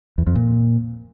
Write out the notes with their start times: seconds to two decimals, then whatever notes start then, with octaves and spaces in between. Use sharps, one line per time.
0.18 E2
0.27 F2
0.35 A#2